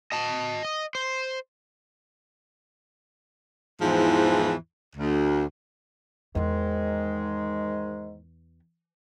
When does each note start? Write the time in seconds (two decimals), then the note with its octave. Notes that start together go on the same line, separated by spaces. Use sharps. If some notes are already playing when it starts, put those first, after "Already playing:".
0.12 D#5 A5
0.65 D#5
0.95 C5
3.81 E2 G#2 E3 F3
4.96 D2
6.35 E2 G#2 D#3 E3 G#3